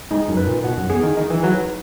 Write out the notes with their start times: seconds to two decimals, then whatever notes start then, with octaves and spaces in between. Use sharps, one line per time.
0.11 G#2 D#4
0.28 F#2
0.37 B4
0.46 A#2
0.63 B2 F#5
0.77 F#2
0.90 E2 G#4
1.03 D#3
1.17 D#3 D#4
1.30 E3
1.43 F#3 B4